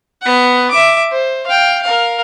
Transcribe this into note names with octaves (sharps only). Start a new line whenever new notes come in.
B3 F#5
E5 D6
C5
F5 G5
A#4 F5